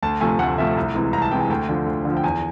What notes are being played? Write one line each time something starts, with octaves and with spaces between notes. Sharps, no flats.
D2 A5
C3 F3 A3 G#5
D2 F#5
C3 F3 A3 E5
C2
C3 E3 G#3
C2 A#5
A5
C3 E3 G#3 G5
G#5
D2 G5
D3 F3
D2
D3 F3
G5
E2 G#5